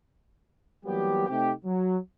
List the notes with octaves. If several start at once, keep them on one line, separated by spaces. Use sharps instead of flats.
E3 F#3 G3 A#3 B3 G4
C3 A3 C4 D#4 G4
F#3